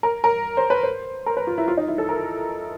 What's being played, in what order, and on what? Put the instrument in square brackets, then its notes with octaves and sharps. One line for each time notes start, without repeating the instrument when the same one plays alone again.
[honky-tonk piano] A#4
A#4
C5
B4
C5
A#4
B4
F4
E4
F4
D#4
E4
A4
A#4